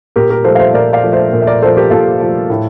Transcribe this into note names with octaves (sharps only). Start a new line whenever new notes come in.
A#2 G4 A#4
G4 A#4
F3 A3 A4 C5
F5
C5 E5
A#2 A#4 D5
D5 F5
F3 A3
C5 E5
A#2
E5
A#4 D5
F3 A3 A4 C5
G4 A#4
A#2 F4 A4
F3 A3
A2